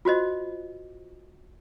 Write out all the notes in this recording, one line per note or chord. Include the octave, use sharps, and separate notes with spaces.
F4 F#4 C5 D#5